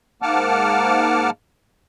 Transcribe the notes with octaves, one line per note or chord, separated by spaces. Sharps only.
G#2 A#3 F#5 A5 D6 F6